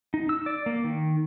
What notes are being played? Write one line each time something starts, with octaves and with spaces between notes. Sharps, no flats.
D#4
E6
D5
A#3
D#3